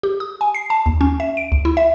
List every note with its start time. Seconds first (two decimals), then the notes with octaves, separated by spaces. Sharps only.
0.03 G4
0.20 D#6
0.41 G#5
0.55 C7
0.70 A5
0.86 D#2
1.01 C#4
1.20 E5
1.37 D7
1.52 D2
1.65 E4
1.77 E5